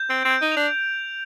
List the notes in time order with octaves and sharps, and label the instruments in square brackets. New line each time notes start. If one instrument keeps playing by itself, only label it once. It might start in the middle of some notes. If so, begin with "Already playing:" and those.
Already playing: [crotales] G6
[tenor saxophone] C4 [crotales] D7
[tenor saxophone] C4
[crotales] G6
[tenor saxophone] D#4
[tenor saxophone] D4 [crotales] F7